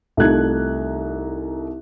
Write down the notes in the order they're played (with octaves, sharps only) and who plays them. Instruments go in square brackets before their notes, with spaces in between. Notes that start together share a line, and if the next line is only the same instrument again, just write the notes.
[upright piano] C2 A3 D#4 F4 F#6 G#6